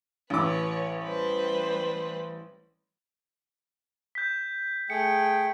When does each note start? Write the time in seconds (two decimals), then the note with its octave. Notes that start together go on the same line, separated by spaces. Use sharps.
0.30 A1 B4 C#5 D6
1.01 G3 B4 C5
4.15 G6 B6
4.90 A3 G#4 G5 C#7